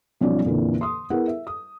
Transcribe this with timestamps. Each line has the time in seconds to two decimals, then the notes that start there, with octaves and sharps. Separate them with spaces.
0.21 B1 F3 G3 C#4 D#4 D5
0.45 F2 A#2 D3 E3
0.81 C6 D#6
1.10 B3 E4 G#4 A#4 F#5
1.28 E5
1.47 D#6